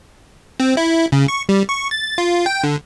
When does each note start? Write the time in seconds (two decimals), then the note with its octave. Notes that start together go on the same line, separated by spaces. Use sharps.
0.60 C4
0.77 E4
1.12 C#3
1.28 C#6
1.49 G3
1.69 C#6
1.91 A6
2.18 F4
2.46 G5
2.64 D3